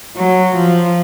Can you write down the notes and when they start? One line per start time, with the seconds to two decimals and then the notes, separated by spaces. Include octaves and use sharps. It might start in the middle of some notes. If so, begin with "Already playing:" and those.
0.17 F#3
0.55 F3